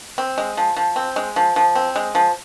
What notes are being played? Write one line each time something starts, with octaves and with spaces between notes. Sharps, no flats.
C4
G#3
F3
F3
C4
G#3
F3
F3
C4
G#3
F3